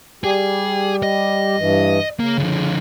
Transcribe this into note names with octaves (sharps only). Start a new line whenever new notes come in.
G3 G4 G#4
D#5
G2 E3
C#3 A#3
D3 F3